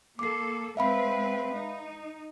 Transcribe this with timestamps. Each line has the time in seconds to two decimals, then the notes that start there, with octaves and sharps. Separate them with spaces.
0.19 A#3 A4 D6 C7
0.77 G#3 C4 B4 E5 F5 B5
1.54 D#4